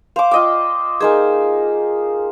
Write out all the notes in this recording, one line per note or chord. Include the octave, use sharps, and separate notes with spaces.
C5 F5 D6
F4 D#5 G5 D6
A#3 D#4 G#4 C5 G#5